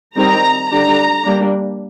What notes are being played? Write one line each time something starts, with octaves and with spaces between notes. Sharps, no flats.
D#3 G3 C4 D#4 A#5
D3 G3 D4 A#5
G3 A#3 D4